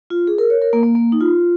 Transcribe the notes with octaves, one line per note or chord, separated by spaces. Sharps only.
F4
G#4
A#4
C#5
A#4
A#3
A#3
A#3
D#4
F4